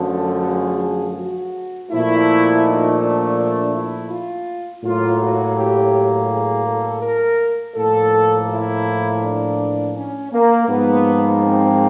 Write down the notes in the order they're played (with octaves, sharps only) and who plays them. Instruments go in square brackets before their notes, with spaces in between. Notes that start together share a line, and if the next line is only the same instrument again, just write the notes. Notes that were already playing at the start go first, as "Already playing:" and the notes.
Already playing: [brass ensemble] F#2 D3 F3 A3
A4
G#4
F#4
A#2 F3 A3 E4
D#4
D4
D4
E4
F4
A2 F#3 A#3 F4
F#4
G4
G#4
A4
A#4
A2 F3 A#3 A4
E4
D4
C#4
A#3
G#2 F3 A#3 B3
C4